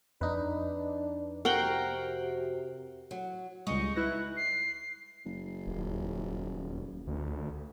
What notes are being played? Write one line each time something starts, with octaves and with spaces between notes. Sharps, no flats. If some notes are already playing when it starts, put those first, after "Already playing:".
F2 D4 D#4 B4
C3 F#4 A#4 F#5 G5 C7
F#3
C#2 G3 G#3 D#4 C#6 D#6
E4 B4 F#6 A#6
C7
F#1
D#1
D2